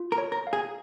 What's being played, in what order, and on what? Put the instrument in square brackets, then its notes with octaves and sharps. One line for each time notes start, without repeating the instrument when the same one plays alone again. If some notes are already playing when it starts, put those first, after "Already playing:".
Already playing: [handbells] F4
[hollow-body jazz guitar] A#4
[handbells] C#5
[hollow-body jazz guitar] A#4
[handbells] F5
[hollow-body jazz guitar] G#4